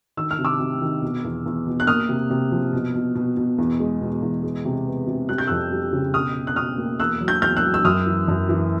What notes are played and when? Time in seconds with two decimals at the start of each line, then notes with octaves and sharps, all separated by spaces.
0.17 D#3 E6
0.31 F6
0.39 C3
0.45 D6 E6
0.60 C3
0.81 D#3
1.02 B2
1.24 E2
1.46 E2
1.66 B2
1.80 F#6
1.87 A#3 D#6 F6
2.09 C3
2.30 C3
2.52 F3
2.73 B2
2.94 B2
3.15 B2
3.37 B2
3.58 E2
3.80 G#3
4.01 B2
4.22 E2
4.43 G#3
4.65 C3
4.86 B3
5.07 C3
5.29 G3 F#6
5.38 G6
5.47 F2 E6 F#6
5.71 G3
5.93 C#3
6.14 B2 D#6 F6
6.35 B2
6.47 F#6
6.56 B2 D#6 F6
6.78 A#3
7.00 E2 E6 F#6
7.21 F#3
7.28 G6
7.42 E2 F6 G6
7.57 E6 F#6
7.63 F#3
7.74 E6
7.84 F#2 D#6 F6
8.06 E3
8.28 F#2
8.49 E3